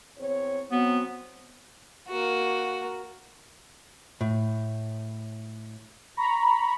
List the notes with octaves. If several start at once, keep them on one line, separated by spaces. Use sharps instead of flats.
E2 C4 C#5
F#3 B3 C4
A#3 F#4
A2
A#5 B5 C#6